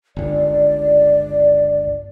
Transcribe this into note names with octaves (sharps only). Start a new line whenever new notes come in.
G1 C#2 D5